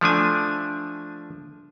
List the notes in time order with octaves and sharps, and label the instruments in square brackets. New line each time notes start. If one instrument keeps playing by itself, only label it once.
[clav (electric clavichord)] F3 A3 D4 G#5